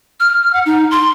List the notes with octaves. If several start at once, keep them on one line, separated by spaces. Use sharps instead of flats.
F6
F#5
D#4
C6